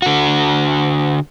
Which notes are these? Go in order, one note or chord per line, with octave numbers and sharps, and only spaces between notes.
D3 F#4